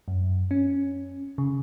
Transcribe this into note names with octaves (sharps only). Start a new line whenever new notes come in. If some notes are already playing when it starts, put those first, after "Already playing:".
F#2
C#4
C#3